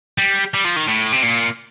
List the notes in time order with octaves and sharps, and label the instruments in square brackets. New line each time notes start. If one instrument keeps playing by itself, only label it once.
[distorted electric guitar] G3
G3
F3
D#3
A2
C3
A#2